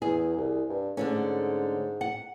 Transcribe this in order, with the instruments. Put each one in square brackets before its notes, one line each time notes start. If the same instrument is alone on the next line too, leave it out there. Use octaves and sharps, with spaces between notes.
[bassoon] E2 [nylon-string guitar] G#4
[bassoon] C2
G2
[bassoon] G#2 [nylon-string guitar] D3 A3 C#4
[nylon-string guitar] F#5